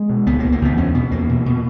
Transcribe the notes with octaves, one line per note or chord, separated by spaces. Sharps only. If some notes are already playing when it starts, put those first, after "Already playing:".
Already playing: G#3
B2
C#2 B3
A#3
C#2
A#3
C#2 B3
E2 C#4
B2 B3
E2 A#3
B2
B2